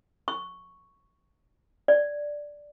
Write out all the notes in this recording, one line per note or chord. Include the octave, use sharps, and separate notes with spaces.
C#6
D5